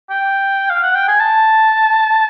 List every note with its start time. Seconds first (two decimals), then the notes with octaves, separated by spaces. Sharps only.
0.10 G5
0.70 F5
0.83 F#5
0.95 G5
1.08 G#5
1.20 A5